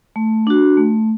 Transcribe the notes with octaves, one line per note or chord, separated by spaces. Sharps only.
A3
D4 F#4
A3